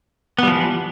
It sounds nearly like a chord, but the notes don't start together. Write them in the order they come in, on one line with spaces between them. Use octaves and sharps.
B3 G3 F3 E3